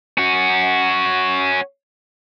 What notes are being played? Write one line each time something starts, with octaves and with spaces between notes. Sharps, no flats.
C#4 F#4